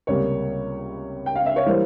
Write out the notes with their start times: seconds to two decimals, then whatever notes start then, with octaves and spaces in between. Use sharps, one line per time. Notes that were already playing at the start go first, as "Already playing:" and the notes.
0.07 C#2 C3 G3 A#3 C#5
1.26 G5
1.36 F5
1.46 E5
1.56 C#5
1.66 E3 G3 A#3 C5